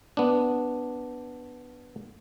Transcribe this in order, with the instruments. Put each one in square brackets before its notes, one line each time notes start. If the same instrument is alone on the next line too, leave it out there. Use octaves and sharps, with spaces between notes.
[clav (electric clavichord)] B3 D4